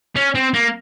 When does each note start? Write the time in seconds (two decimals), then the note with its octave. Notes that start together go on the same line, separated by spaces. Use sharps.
0.16 C#4
0.35 C4
0.54 A#3